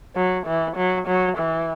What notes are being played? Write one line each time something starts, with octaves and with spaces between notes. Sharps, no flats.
F#3
E3
F#3
F#3
E3